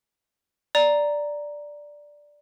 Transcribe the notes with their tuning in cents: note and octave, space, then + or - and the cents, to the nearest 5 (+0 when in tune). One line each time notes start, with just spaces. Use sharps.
D5 +0 A#5 +0